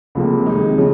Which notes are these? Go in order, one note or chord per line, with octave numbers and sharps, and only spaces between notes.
C#2 C3 F3 A#3
C3 D#3 G#3 D#4
C#3 F3